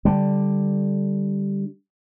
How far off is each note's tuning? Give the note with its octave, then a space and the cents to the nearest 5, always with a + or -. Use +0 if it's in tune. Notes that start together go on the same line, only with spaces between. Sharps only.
D3 +0 G3 +0